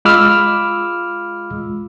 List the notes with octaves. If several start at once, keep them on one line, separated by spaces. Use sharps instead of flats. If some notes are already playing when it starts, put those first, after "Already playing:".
G#3 F4 B5 D6 E6 F6